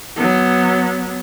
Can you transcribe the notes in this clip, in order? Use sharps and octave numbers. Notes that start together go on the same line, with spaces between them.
F#3 B3